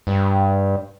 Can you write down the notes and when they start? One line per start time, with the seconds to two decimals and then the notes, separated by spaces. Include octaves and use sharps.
0.07 G2